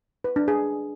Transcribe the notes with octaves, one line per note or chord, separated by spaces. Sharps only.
B4
D4
G#4